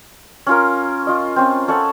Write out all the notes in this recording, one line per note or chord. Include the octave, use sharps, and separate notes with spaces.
C#4 F4 A#4
F4 D#5
C4 C#4
C#4 A4 C#5 F#5